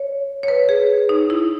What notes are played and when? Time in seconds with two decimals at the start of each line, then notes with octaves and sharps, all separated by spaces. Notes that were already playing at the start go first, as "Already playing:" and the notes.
Already playing: C#5
0.43 C#5
0.48 B4
0.69 G#4
1.09 D#4
1.30 E4